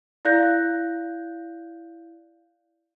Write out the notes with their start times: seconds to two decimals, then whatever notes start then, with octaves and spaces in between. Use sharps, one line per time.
0.25 E4 D5 F5 F#6 G6 A#6